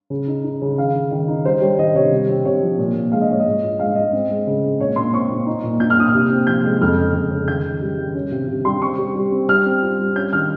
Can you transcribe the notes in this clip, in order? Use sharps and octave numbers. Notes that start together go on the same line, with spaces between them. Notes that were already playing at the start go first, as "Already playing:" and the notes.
C#3
D#4
D#4
C#3
D#3 F5
D#3
D#3
D#4
G3 C5
G3 C#5
D#3 D#5
C3 C#5
C3
C4
C3 C#5
F3
A#2
A#2
G#3 F5
D#5
G#3 C#5
D#5
G#2
F4
G#2 F5
G#2 D#5
C4
G#3
C#3
G#3
A#2 C#5
A#2 C6
C4 C#6
A#2
D#4
A#2
A#2 G6
F6
A#2 D#6
F6
C3
C4
F3 G6
G#3
F2 F6
C#3
F2
C#3
D#3 G6
D#3
G3
D#3
C#4
C3
C3
G3 C6
C4 C#6
G3
G3
C4
G3 F6
C4
F4
G3
C#4 G6
D#3 F6